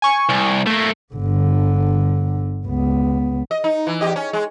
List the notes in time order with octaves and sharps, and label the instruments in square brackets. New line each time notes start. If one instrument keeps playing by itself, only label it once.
[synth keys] G#5 C#6
[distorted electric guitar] C2
A3 A#3
[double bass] G1 D3
C#2 B3
[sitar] D#5
D#4
E3
E2 G4 D#5
C#4
G#3